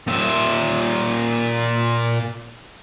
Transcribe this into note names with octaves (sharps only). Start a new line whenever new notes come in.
A#2 E5